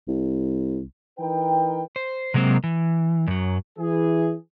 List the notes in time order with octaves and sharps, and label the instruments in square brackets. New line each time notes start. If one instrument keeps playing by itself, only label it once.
[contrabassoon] C2
[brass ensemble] E3 D#4 A#4 B4 G5
[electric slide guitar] C5
C3 F#3 G#3 A#3 C4
E3
F#2 F#3
[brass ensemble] E3 G#4